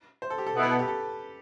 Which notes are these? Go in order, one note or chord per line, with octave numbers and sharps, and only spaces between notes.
C5
A4
G4
A4
B2 B3 E4
B4
A4
G4
A4